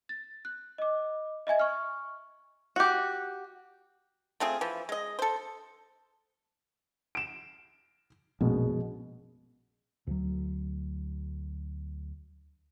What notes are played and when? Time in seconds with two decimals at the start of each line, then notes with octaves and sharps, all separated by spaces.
0.09 A6
0.45 F#6
0.78 D#5 D6
1.47 D#5 E5 G#5 G#6
1.60 C#6 F6
2.76 F#4 G4
4.40 A3 C4 F4 G#4
4.61 E3 F3
4.89 G#3 D#5
5.19 A4 C5
7.15 D7 E7
8.41 A#1 F#2 B2 G#3
10.07 D2 F#3